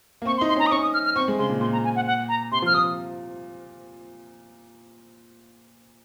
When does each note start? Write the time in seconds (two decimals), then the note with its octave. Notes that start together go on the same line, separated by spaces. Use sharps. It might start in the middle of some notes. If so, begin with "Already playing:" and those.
0.22 A#3
0.25 C4 C#6
0.37 C6
0.41 D#4
0.49 C6
0.56 C#4 A#5
0.66 D#6
0.72 C#4 C#6
0.82 D#6
0.93 F6
1.05 F6
1.16 C4 C#6
1.28 G#3
1.39 C#3 C6
1.50 A#2
1.61 A#2 C6
1.73 A#5
1.84 G#5
1.96 F#5
2.07 F#5
2.29 A#5
2.52 C3 C6
2.62 F3
2.67 F6
2.74 F3 D#6